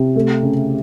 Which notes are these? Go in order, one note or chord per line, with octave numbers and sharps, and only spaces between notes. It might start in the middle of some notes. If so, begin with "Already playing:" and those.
Already playing: C3
A3
C#3